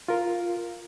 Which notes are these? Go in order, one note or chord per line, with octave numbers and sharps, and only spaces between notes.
F4 A#4